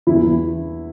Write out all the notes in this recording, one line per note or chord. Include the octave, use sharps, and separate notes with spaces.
E2 E4
E2